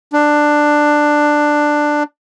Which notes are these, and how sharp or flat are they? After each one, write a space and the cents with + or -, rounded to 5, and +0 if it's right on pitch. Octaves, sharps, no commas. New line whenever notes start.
D4 +10